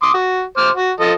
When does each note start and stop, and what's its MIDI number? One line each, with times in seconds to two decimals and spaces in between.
0.02 0.12 84
0.02 0.12 86
0.02 0.12 87
0.14 0.43 66
0.57 0.70 72
0.57 0.70 86
0.57 0.70 89
0.76 0.91 66
1.00 1.13 53
1.00 1.13 69
1.00 1.13 75